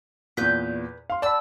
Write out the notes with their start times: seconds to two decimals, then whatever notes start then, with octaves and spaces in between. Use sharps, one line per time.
0.37 E2 A#2 B4 G6
1.10 F5 C6
1.22 D5 F#5 A5 B5 E6